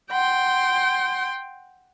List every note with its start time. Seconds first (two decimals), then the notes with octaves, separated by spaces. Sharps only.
0.11 F#5 G5 C6